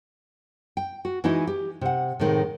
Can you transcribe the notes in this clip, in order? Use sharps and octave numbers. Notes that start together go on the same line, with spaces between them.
G5
F#4
E3 G#3 D#4 E4 F#4 D#5
G4
C3 F#5
A2 C3 D#3 G#3